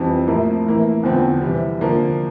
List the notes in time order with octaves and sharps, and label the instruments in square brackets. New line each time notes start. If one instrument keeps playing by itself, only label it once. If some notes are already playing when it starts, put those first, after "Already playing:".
Already playing: [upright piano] F2 E3 G3 C4
A2 F3 A#3 E4
A2 E3 A#3 E4
E2 D3 F3 C4
C3 E3 G3
D3 F3 A#3 D4